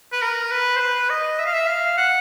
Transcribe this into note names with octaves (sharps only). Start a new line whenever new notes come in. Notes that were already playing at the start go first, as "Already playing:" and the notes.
B4
A#4
B4
C5
B4
D#5
E5
F5
E5
F5
F#5